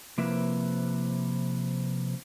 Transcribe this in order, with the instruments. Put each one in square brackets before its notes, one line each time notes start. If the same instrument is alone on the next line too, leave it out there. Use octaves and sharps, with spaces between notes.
[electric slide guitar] C3 F3 A#3 E4 B4 E5